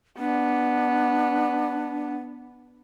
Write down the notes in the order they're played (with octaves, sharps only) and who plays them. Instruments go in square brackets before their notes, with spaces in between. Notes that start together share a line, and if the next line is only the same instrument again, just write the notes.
[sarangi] B3 [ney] D4